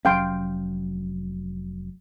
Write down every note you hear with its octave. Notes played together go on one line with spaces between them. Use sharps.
F1 F#3 C#4 F5 G5 C6